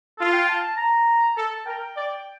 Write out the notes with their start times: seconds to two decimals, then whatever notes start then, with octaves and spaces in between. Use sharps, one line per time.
0.18 F4 A4
0.29 F5
0.33 G5
0.49 A5
0.62 A5
0.77 A#5
1.36 A4 A5
1.66 A#4 G5
1.96 D5